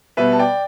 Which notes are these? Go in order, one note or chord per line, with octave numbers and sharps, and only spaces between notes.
B2 G3 B3 B4 E5
A5
D5 G5